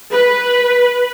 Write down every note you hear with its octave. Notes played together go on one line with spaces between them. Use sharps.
B4